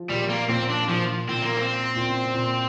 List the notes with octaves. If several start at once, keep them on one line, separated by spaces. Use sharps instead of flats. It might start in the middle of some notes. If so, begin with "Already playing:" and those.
Already playing: F3
A#2 G3
A#3
A#2 C4
D4
A#2 F3
A#2 C4
A#3
C4
A#2
C3
A#2